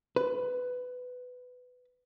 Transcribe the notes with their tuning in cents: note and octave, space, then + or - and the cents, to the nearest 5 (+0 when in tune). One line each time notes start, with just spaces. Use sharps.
B4 +15